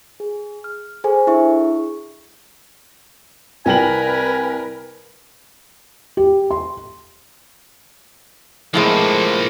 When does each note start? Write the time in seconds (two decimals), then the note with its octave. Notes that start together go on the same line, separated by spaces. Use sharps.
0.20 G#4
0.64 F6
1.04 G#4 A4 C5 G#5
1.27 D4 E4 G#4 E5 C#6
3.66 C2 A#4 B4 G5 G#5 F#7
6.17 G4
6.51 C6
8.74 A2 C3 F3 G#3 A#3